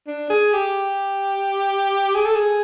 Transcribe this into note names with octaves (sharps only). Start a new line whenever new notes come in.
D4
G#4
G4
G#4
A4
G#4